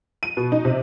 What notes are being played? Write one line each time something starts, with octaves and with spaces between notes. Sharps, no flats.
D#7
B2
D#4
C3